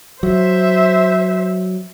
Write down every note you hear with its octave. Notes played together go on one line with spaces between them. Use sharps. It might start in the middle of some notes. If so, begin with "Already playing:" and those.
F#3 C5 E5